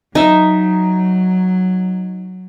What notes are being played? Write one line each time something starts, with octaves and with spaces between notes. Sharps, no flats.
F#3 D#4 E5